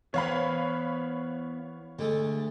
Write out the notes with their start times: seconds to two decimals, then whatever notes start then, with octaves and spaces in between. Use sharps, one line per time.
0.14 E3 B3 C5 C#5 F5 B5
1.99 D2 D3 G#3 A3